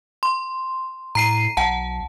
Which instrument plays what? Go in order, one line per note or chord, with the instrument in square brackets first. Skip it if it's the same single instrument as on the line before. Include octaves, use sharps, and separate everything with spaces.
[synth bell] C6
[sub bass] A2 [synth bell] A#5 C7 D#7
[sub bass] B1 [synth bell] F#5 A5